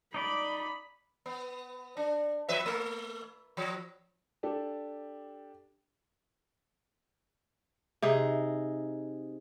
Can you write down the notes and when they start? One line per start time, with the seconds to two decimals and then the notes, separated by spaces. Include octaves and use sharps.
0.14 D#4 D5 B5
1.26 B3
1.97 D4
2.49 F3 B4 E5
2.66 A3
3.57 F3
4.43 D4 G4 A4
8.02 C3 D#4 G#4